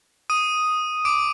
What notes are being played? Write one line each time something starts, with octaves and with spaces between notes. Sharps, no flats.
D#6 D#7
D6 D7